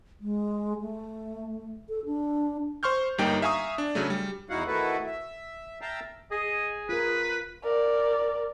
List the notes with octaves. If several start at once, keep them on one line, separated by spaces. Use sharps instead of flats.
G#3
A3
A4
D4
C5 C6 C#6 F6 G6
G1 G3 A#3 D#4 G5
E5 F5 G#5 A#5 C#6 D#6
D4
C#3 F#3 A3
G3
E2 D#4 E4 F#4 F5 F#5
D#3 A3 E4 F#4 A4 B4
E5
E5 F5 G5 A5 A#5
G#4 D#5
F4 A#4 B4
A#4 D5